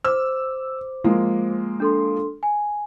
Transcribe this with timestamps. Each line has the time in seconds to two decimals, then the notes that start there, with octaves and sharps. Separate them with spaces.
0.05 C5 D6 E6
1.04 F3 G#3 A#3
1.80 D4 A4 C6
2.43 G#5